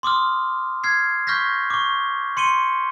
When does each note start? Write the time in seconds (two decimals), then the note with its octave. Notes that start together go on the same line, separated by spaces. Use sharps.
0.03 C6 D6 D#6 F6
0.84 F6 G#6 C7
1.27 C#6 F6 G6 A#6 B6
1.70 C#6 D6
2.37 C6 C#7 D#7 G7